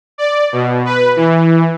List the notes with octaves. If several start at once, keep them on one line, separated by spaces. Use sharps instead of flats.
D5
B2
B4
E3